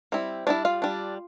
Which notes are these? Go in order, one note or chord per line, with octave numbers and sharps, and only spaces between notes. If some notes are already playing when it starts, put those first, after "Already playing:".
G3 C4 E4
G3 C4 D4 E4 D5
F4 F5
G3 D4